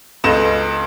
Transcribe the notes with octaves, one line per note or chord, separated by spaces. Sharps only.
C#2 A4 B4 D#5 E7